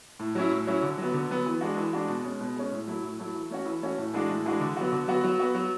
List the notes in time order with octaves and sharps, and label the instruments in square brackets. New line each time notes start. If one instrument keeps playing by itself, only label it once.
[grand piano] A2
F#3 C#4 E4
A2
F#3 C#4 E4
D3
F#3 B3
D3
F#3 B3
E3
G#3 D4 F#4
E3
G#3 D4 F#4
B2
G#3 C#4
B2
G#3 C#4
A2
F#3 A3 E4
A2
F#3 A3 E4
E3
A3 C#4 F#4
E3
A3 C#4 F#4
A2
E3 G#3 D4 F#4
A2
E3 G#3 D4 F#4
D3
F#3 B3 F#4
D3
F#3 B3 F#4
F#3
B3 F#4
F#3